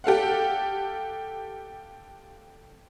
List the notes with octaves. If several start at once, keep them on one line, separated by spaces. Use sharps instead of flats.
G4 A4 F5 F#5